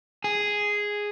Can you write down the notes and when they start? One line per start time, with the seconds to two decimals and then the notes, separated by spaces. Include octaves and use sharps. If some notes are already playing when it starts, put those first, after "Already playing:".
0.24 G#4